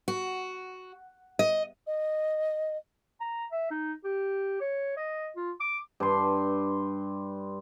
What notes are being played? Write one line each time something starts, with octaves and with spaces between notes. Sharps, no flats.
F#4
D#5
D#5
A#5
E5
D#4
G4
C#5
D#5
F4
D6
G2 C6